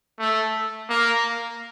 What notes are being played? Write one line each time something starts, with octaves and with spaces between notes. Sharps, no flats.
A3
A#3